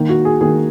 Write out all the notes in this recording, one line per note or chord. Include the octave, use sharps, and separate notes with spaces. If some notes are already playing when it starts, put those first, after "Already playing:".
Already playing: D#3 A#3
F#4
G#4
D#3 A#3 G#4